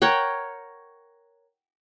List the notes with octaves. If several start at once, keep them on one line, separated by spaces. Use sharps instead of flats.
A#4 C#5 F#5 G5